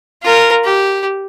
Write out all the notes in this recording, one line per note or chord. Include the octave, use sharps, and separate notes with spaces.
F4 A#4
G4